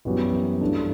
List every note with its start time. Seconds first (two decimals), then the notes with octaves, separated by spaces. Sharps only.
0.05 F#2 E3 G3 B3 F#4
0.61 G2 E3 A3 D4